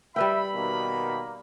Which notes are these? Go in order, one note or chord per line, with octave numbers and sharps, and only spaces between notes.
G3 B4 E5 G5 B5
B2 D#3 A#3